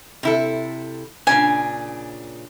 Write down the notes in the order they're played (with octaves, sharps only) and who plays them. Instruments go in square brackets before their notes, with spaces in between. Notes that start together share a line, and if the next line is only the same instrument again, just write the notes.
[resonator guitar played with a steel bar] C3 E4 A4
[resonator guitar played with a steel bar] A#2 C#3 D4 [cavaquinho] G#5